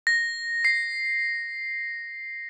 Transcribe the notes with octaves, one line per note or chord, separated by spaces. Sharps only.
A#6
C7